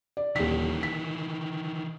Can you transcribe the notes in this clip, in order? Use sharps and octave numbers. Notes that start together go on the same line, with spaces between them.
D5
D#1 D#3 E3 B6
B6